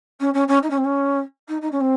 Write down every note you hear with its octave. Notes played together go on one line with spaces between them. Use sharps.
C#4
C#4
C#4
D#4
C#4
C4
C#4
D#4
D#4
C#4
C4